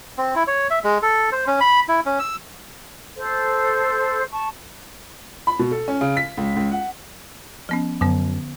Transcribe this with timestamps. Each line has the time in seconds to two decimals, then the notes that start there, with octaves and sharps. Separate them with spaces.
0.18 C4
0.35 E4
0.47 C#5
0.70 E5
0.84 G#3
1.02 A4
1.32 C5
1.47 C#4
1.61 B5
1.88 E4
2.06 C#4
2.19 E6
3.15 A4 C5
4.30 A5 C#6
5.47 B5
5.59 B2
5.71 A4
5.88 C#4
6.01 C#3
6.17 B6
6.37 C#2
6.56 C#2
6.72 F#5
7.69 F3 B3 C#4
8.01 F#2 D3 B3